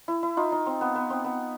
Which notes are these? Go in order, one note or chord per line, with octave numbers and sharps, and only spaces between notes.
E4
E4
D#4 F4
D#4
C4
B3
B3
C4
B3